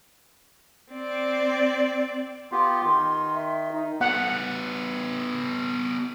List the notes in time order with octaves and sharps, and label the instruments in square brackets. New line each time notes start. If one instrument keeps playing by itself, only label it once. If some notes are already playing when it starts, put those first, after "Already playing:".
[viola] C4 D5
[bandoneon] B3 F4 G4 [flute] C6
[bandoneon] D#3
[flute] E5
D#4
[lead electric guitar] B3 A4 [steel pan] F#5